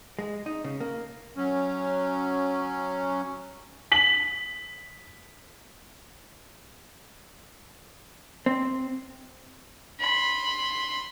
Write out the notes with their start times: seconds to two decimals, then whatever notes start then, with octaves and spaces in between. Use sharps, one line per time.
0.19 G#3
0.46 D#4
0.64 C#3
0.80 A#3
1.37 F#3 C#4
3.92 B6 F#7
8.46 C4
10.00 B5 C6